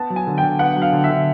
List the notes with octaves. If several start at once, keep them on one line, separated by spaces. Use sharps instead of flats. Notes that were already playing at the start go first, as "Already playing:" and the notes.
Already playing: B3 A5
F#3
G#5
D3
G5
D3
B3 F#5
F#3
F5
D3
E5
D3